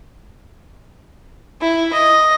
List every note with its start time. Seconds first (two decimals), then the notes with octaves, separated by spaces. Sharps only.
1.61 E4
1.93 D#5